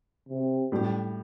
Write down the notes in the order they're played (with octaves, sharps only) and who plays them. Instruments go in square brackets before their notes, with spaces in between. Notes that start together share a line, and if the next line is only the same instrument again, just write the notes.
[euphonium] C3
[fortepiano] A2 G3